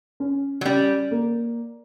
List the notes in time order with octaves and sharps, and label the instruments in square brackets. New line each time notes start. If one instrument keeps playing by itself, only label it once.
[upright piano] C#4
[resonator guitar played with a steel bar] F#3
[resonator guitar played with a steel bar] G3 [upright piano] C#4
[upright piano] A#3